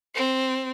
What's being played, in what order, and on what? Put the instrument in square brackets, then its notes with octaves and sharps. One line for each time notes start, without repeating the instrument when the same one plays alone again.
[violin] C4